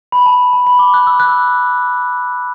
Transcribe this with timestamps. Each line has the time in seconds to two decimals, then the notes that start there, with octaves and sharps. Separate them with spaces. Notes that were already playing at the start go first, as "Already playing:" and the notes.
0.12 B5
0.26 A5
0.53 A5
0.67 B5
0.79 D6
0.94 F#6
1.07 E6
1.20 F#6